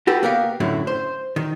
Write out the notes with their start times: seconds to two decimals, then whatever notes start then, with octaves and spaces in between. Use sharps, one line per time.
0.07 F#4 G4 A4 B4
0.23 A#3 B3 G4 A#4 F5
0.60 F#2 A2 D3 F#3 E4
0.87 C5
1.36 D#3